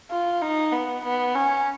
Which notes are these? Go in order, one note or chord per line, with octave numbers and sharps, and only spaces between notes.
F4
D#4
B3
B3
C#4